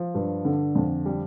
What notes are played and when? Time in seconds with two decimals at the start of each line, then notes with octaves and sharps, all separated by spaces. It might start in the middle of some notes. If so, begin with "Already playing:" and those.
Already playing: F3
0.14 G2
0.45 D3
0.75 F2
1.06 G3